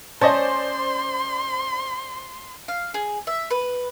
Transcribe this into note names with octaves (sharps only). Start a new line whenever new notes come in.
C#4 C5 D5 D#5 A5 C6
F5
G#4
E5
B4